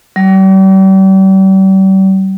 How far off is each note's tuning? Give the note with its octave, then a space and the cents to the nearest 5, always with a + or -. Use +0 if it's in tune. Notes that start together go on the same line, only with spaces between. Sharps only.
G3 -40